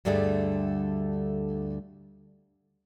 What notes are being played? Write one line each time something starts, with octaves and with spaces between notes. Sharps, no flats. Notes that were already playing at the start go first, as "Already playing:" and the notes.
D2 G2 D3 G3 A3 G#4